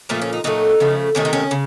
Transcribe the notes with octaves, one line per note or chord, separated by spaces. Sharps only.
A#2 F3 A3 F4
C#4
D#4
A#2 F#3 A3 D#4
C#3 F3 A3
C3 D#3 A3 C#4
D#4
C#4
C#3